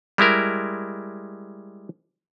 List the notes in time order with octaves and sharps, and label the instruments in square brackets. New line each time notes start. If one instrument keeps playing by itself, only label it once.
[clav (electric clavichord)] G3 G#3 E4 A#4